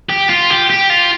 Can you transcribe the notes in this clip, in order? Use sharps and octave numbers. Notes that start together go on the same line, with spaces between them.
G4
F4
G4
G4
F4